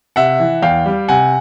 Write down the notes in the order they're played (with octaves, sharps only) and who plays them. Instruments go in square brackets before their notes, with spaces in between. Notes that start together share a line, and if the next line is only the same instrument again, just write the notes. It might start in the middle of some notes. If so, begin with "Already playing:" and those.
[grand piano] C3 E5 F#5
E3
E2 F5 G5
G3
C3 F#5 G#5